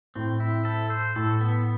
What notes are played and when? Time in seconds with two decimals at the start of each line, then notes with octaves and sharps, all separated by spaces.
0.16 A2 C4
0.40 E4
0.65 A4
0.90 C5
1.16 A2 A4
1.41 B3